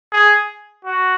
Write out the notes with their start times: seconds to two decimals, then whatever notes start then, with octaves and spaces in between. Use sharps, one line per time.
0.13 G#4
0.85 F#4